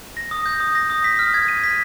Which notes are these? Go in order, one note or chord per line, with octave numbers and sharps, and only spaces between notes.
A#6
D#6
G6
D#6
A#6
D#6
B6
F6
G#6
D#7
B6